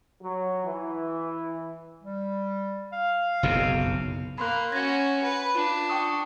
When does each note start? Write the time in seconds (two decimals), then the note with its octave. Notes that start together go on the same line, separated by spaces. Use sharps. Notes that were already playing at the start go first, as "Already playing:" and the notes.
0.22 F#3
0.64 E3
2.03 G3
2.93 F5
3.43 F#1 B1 C3
4.38 A#3 B5 C6 F#6
4.72 C#4 F#4 G#6 A#6
5.23 B4
5.55 D4 F4
5.90 G5 C#6 D#6